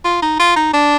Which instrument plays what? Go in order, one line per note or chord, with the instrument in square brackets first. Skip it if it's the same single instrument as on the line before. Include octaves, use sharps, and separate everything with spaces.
[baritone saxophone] F4
D#4
F4
D#4
D4